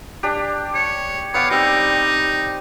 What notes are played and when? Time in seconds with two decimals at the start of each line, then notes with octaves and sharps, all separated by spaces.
0.23 D4 G4
0.75 C#5
1.34 B3 C#5 F5 D6
1.50 G3 C4 D#4